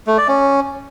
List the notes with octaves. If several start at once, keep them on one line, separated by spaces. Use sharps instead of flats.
A3
D5
C#4